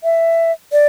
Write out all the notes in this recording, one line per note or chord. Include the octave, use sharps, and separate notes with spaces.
E5
D5